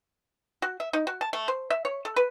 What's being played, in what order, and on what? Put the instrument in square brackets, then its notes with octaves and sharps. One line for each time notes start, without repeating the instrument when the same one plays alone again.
[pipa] F#4
E5
D#4
F#4
A5
A3
C5
E5
C#5
A4
B4